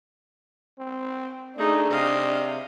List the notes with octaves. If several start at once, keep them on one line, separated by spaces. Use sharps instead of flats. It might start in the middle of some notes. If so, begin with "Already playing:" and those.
C4
A3 D4 D#4 G#4
C3 D#5 F5